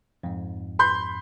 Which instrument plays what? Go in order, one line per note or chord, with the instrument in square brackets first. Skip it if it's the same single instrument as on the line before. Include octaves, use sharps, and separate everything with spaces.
[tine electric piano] F2 G#2
[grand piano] B5 C6 G6